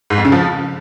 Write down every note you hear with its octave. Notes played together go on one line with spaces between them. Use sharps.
G#2
F2
C#3
F3